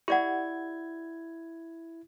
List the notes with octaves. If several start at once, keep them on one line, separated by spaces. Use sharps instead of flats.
E4 G4 D5 F#5 G#6